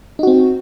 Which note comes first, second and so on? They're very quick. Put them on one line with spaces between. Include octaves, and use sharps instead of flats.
D#4 F#4 C4